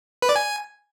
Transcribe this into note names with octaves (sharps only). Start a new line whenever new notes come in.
B4
D5
G#5